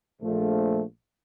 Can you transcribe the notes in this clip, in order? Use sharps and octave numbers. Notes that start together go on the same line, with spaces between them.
A#1 F3 A3